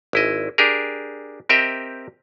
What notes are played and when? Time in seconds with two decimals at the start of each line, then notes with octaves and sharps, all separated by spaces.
0.13 G#1 E4 D#5
0.58 D4 G4 G#4 A#4
1.49 C4 G4 A#4 D#5 E5 G5